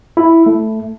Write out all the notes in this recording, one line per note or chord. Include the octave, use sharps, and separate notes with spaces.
E4
A3